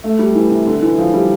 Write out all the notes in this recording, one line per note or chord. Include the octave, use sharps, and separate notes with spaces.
A3
G3
E3
C3
D3
E3
F3
G3